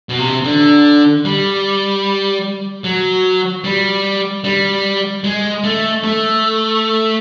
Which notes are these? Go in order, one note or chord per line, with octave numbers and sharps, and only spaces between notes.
B2
C3
D3
G3
F#3
G3
G3
G#3
A3
A3